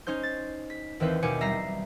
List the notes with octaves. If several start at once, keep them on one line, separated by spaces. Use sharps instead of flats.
C#4 D#4 C5 G6
A6
B6
D#2 E3 C4 B4 G6
D#2 B2 C#5 G#5 D6 C#7
B1 G3 E5 A#5 A#6 C7